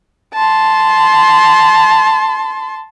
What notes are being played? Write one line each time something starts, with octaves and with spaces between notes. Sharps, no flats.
A5 C6